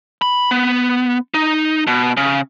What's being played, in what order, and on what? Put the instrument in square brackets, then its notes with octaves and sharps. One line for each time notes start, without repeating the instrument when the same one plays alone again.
[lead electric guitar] B5
B3
D#4
B2
C#3